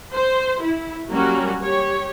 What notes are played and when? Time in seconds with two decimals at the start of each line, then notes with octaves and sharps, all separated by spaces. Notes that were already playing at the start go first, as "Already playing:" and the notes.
0.12 C5
0.61 E4
1.10 F#3 G3 A#3 C#4 F#4 A#4
1.60 G4 C#5